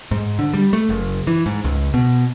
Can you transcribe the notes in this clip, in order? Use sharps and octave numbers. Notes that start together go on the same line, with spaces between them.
G#2
D3
G3
A3
F#1
E3
G#2
C#2
B2